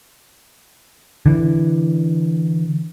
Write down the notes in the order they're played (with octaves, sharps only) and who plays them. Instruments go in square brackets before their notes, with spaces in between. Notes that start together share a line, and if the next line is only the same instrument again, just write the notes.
[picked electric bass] D3 E3